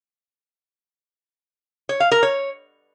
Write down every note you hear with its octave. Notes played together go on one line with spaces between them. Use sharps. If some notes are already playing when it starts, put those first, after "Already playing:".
C#5
F5
A#4
C#5